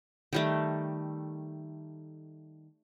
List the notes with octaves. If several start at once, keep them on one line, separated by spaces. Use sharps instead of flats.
D#3 G3 A3